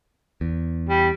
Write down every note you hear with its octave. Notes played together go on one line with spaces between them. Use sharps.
E2
G3